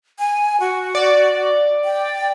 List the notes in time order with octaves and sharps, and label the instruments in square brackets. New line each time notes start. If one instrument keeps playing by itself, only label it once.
[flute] G#5
F#4
[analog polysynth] D5
[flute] G5